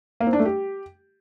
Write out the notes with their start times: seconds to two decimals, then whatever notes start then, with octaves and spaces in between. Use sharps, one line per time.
0.20 A#3
0.27 C4
0.33 D4
0.39 A3
0.45 G4